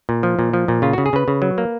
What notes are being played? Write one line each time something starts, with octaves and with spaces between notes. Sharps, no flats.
A#2
F3
A#2
F3
A#2
C#3 F4
C#3 F#4
G#4
C#3 B4
C#3
F#3
A#3